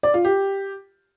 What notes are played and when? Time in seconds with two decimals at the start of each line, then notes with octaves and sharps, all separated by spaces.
0.03 D5
0.14 F4
0.25 G4